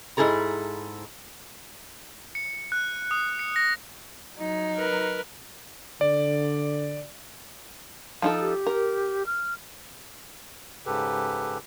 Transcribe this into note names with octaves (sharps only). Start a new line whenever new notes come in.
G#2 E4 G#4 A4 A#5
C#7
F#6
D#6
C#7
A#6
F#3 D#4
A#4 B4
D3 D5
F3 D#4 A4
G4
A#4
F6
G#2 C#3 G4 A4 B4